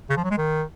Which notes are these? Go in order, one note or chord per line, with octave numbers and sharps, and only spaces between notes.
C#3
F3
F#3
G#3
D#3